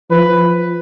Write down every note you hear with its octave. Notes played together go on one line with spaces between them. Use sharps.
F3 B4